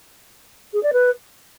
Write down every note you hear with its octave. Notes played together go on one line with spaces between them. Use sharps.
G#4
D5
B4